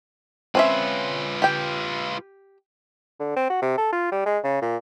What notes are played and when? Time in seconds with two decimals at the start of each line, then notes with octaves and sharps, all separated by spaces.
0.55 C4 C#4 F4 B4 E5
1.42 G4 G5
3.20 D3
3.36 C4
3.50 F#4
3.62 C3
3.78 A4
3.92 F4
4.12 G3
4.26 G#3
4.44 C#3
4.62 A#2